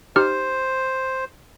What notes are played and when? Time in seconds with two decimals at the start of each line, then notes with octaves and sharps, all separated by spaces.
0.16 D#4 G4 C5 F6